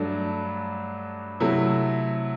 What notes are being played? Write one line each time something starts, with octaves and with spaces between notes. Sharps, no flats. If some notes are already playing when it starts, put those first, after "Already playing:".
Already playing: G2 F#3 A3 D4
C3 F#3 A3 E4